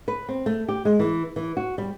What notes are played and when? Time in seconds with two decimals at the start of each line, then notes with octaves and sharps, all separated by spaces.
0.08 B4
0.29 C4
0.46 A3
0.68 G4
0.85 G#3
0.99 E3
1.36 E3
1.57 F#4
1.78 G3